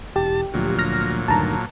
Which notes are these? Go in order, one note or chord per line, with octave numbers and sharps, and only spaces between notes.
E1 G4 A5
D2 A#2 F3 F#3
F6 A#6
D2 G2 D#3 A5 A#5